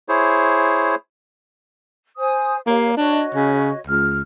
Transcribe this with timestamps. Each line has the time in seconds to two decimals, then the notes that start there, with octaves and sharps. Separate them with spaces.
0.09 E4 G#4 C5 C#5
2.17 C5 G#5 D#6
2.67 A#3 G4 C#5 F5
2.97 D4 F#4 C#5 D#5
3.34 C#3
3.87 C#2 F6